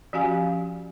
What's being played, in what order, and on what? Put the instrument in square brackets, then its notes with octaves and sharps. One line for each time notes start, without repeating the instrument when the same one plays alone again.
[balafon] F3 C#4 F#4 G4 F5 G#5